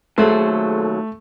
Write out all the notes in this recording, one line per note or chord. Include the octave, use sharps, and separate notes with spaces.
D#2 F#3 A3 G#4 A4 C5